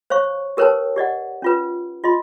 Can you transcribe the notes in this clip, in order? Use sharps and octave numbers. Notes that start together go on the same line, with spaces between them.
C5 C#5 F5 C#6
G4 A#4 B4 C#5 G5 A5
G4 D5 D#5 F#5
C#4 F4 B4
F4 D#5 C6